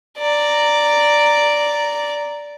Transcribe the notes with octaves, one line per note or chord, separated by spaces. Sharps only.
D5 A#5